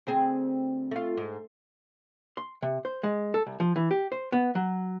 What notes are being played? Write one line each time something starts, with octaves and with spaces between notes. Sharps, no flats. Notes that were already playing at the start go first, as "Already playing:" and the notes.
D2 C4 G#4
A3 F4
G#2
C6
C3
C5
G#3
A4
C2
F3
E3
G4
C5
B3
F#3